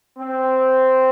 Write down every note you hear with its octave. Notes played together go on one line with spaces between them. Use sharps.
C4